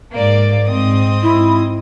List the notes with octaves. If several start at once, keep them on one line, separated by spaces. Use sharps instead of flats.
G#2 A#3 D5
G#2 C4 D#5 D#6
E4